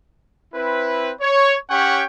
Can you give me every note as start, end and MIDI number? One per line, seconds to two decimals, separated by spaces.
0.55 1.12 60
0.55 1.12 64
0.55 1.12 71
1.21 1.56 73
1.70 2.03 61
1.70 2.03 67
1.70 2.03 73
1.70 2.03 78
1.70 2.03 79
1.70 2.03 85